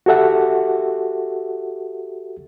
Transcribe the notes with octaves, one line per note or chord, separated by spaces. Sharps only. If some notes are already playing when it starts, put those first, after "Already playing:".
F#4 G4 A4 E5 F#5